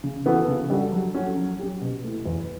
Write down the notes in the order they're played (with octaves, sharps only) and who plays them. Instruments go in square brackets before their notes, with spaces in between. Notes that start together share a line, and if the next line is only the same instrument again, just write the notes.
[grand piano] C#3
E3 B3 F#4 A4
C#3
G3 D4 F#4 A4
F#3
C#4 F#4 A4
F#3
C#4 G4
B2
A3 E4
E2